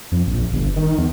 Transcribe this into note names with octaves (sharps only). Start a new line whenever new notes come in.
F2
A#1
G1
D#3
E2